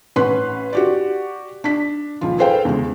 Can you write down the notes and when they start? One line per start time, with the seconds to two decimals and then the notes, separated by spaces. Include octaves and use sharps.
0.16 A1 C#4 B4 F#5 C6 F#6
0.73 F#4 G4 D5
1.64 D4 B6
2.21 C#2 A#2 F3 F4
2.38 G#4 A4 B4 C5 F5 G5
2.65 E2 C#3 G#3